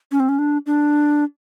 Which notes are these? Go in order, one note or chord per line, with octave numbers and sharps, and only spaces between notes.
C#4
C4
C#4
D4
D4